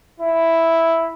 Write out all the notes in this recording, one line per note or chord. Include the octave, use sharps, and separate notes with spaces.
E4